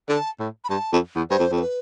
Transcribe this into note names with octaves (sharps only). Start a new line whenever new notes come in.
D3 A5
A2
B5
G2 A5
F2
E2
G2 C5
F2
F2
C5
B4